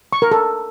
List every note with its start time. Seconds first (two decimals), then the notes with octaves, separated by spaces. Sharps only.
0.13 C#6
0.22 A#4
0.31 A4